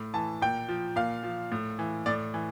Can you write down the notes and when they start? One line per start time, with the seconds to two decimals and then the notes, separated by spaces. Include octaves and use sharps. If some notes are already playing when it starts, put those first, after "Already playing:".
Already playing: A2
0.14 E3 A5
0.42 A#2 G5
0.69 F3
0.96 A#2 F5
1.23 F3
1.52 A2
1.79 E3
2.06 A2 D5
2.34 E3